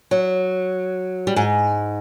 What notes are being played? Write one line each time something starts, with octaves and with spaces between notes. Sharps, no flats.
F#3
G3
G#2 G#3